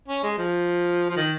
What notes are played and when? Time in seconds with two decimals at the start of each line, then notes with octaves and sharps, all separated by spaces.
0.08 C#4
0.23 G#3
0.38 F3
1.09 F3
1.17 D#3